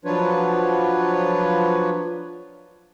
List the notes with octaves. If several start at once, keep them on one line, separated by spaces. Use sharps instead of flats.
F3 F#3 D4 F4 B4 C#5